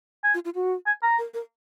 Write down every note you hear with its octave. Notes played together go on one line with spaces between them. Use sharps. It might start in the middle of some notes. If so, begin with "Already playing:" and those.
G#5
F4
F4
F#4
G#5
A#5
A#4
A#4